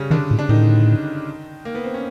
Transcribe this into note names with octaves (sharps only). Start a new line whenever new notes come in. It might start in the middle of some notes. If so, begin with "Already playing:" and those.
Already playing: C#3 G3 C#4
D3 D#3 D4
A2
D4
A2 D#3 D#4
A#3
B3
C4
C#4